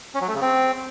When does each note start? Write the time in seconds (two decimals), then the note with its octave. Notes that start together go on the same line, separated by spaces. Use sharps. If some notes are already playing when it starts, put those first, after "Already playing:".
0.15 C#4
0.21 F#3
0.28 A3
0.35 C#3
0.42 C4